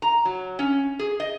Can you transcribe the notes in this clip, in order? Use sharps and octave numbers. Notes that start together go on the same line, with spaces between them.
A#5
F#3
C#4
G#4
D#5